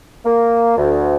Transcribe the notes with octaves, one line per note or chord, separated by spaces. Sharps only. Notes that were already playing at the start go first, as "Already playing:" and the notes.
A#3
D2